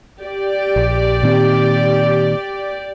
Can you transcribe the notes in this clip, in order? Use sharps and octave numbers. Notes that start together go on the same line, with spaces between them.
G4 D5
A#1
A#2 D#3 C4